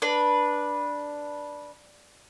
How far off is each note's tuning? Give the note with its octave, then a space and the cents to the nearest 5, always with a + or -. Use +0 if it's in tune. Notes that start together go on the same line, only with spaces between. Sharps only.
D4 +0 B4 -15